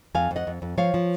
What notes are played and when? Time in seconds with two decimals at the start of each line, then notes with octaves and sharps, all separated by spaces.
0.15 F2 F5 G#5
0.31 F2
0.36 D#5 F#5
0.47 F2
0.62 F2
0.78 F3 C#5 F5
0.94 F3